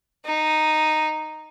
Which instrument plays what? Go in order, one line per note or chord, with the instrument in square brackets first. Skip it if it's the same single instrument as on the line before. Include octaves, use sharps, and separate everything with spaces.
[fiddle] D#4